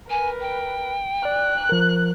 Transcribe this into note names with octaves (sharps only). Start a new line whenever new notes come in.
A#4 B4 G#5
G5
D5 F#6
F3 A#4